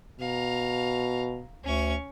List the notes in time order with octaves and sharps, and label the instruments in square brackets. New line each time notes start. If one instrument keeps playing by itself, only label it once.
[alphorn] B2 [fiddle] F5 A#5
[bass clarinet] D2 [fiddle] C#4 C#6